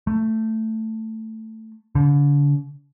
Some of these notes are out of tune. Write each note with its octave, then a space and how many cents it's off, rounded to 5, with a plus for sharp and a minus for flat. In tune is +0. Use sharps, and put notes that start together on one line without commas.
A3 +10
D3 -40